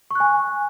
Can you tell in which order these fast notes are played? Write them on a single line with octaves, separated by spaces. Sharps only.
C#6 F#6 G#5